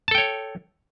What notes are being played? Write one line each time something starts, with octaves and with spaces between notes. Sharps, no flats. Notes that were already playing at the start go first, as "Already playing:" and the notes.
A4 C#5 G5 A5